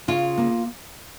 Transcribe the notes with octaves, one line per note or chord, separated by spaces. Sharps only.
C#3 F4
A#3